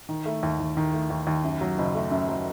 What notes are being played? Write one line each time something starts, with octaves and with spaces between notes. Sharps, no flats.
D#3
A3
D#2
D#2
D#3
A3
D#2
D#2
F#2
F#3
F#1
A3
F#2
F#3